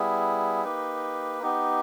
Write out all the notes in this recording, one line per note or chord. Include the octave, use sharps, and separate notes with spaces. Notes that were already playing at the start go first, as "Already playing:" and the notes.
Already playing: G3 B3 E4 G#4
A#3 D#4 G4 B4
B3 D#4 G4